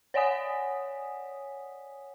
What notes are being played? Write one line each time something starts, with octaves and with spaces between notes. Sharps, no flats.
C#5 D5 F#5 G#5 D#6 B6